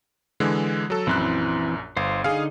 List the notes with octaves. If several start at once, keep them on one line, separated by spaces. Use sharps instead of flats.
D3 E3 G#3
F#3 A4
A#1 F#2 E3 C4 E4 F#6
G1 C5 F5
D3 D#4 G#4 F5